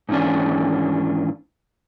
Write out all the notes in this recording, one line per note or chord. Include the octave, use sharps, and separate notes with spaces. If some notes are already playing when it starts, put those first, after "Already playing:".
G#2 D#3 E3 C#4 D4